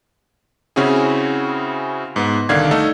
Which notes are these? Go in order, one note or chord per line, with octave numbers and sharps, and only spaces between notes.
C#3 C4 C#4 E4 F#4 G#4
G#2 B3
C2 D3 D#3 D4 F5 G#6
A3 D#4 A4